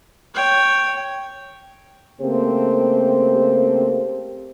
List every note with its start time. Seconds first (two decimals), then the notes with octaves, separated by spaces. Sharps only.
0.35 C#5 G5
2.21 C#3 A3 A#3 C4 G4 C5